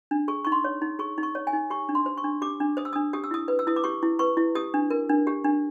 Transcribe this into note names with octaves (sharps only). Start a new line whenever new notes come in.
D4
G#4 C#6
D#4 C#6
C6
C#5
D#4
G#4 C#6
D#4
C#6
C#5
G#5
D#4
G4 C#6
D4
C6
C5
C#6
D4
G4 D6
D4
C5 D#6
E6
D4 D#6
G4 D#6
E6
E4 D#6
B4
E6
E4 D#6
D6
G4 C#6
E4
B4 C#6
E4
G4 D#6
D4
A#4
D4
G4
D4